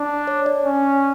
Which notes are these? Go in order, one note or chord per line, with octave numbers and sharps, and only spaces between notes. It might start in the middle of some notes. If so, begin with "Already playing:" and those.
Already playing: D4
C#5
D5
C#4